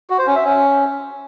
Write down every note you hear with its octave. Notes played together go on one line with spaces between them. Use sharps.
F#4
C5
C#4
E5
C#4